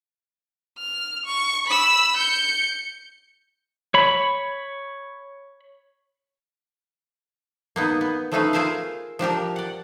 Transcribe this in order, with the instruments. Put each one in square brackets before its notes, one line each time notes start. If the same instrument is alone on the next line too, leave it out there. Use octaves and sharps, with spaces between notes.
[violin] F6
C#6
B5 E6
G6 C#7
[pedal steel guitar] C#5 B5
[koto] A#3 B3 D#4
B3
F3 A3 C#4 D#4 F4 B4
F4 G#4 A#4 C5 E5 F5
F3 D4 G4 A#4
D5 F#5